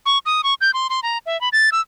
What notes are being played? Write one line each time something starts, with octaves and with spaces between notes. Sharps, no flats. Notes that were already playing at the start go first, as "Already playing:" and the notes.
C#6
D#6
C#6
G6
C6
C6
A#5
E5
B5
A6
E6